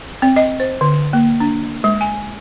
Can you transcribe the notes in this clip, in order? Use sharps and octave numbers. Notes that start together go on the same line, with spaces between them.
C4
D#5
C5
D3
A#3
D4
G#3
G#5